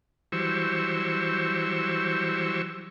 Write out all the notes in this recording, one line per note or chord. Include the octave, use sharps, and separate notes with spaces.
E3 F#3 G3 C5 C#6 E6